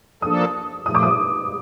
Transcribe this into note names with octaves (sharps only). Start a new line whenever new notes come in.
F3 A#3 D4 A4 D#6
A#2 F3 A3 D#6
D6
D#6